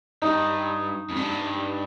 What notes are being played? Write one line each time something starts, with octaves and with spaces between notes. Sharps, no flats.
G2 D#4
F2
G2